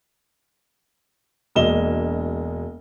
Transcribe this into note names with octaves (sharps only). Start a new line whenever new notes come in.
E1 G#3 A#3 D#5 E7 G7